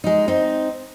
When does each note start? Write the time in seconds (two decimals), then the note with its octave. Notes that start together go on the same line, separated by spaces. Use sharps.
0.04 G#3 D#4
0.28 C4 D#4